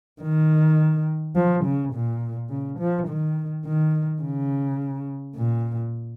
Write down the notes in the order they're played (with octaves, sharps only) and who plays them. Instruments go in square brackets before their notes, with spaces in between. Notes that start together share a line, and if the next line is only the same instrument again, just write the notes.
[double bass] D#3
F3
C#3
A#2
C#3
F3
D#3
D#3
C#3
A#2